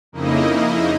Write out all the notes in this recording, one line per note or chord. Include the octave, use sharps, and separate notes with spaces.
F2 C#3 A#3 D#4 E4 D#5